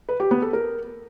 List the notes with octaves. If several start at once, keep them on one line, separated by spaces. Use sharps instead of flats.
B4
G4
B3
A4
A#4